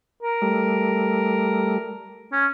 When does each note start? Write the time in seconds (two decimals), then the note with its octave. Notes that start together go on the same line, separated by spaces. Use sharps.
0.22 A#4
0.42 G3 A3
2.32 C#4